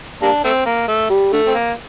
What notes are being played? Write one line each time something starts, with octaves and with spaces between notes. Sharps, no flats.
G3 A#3 D4
A3 C4
A#3
A3
G3
D3 A3
C4
A#3